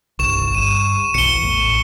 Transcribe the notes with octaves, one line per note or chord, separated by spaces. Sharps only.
G1 C2 C#6 E7
G2 D#7
B1 E2 C#7 G7
A1 A2